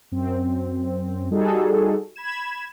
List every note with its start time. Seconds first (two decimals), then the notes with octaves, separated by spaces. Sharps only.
0.12 F#2 C4
1.31 G3 D#4 F#4 G#4 A4
2.15 B5 G#6 E7